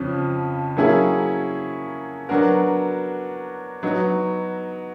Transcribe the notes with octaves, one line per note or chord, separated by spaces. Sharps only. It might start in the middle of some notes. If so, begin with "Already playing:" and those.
Already playing: F2 C#3 F3 C#4
F#3 A#3 C#4 E4 G#4
F#3 B3 D4 F#4 A#4
F#3 B3 D#4 F#4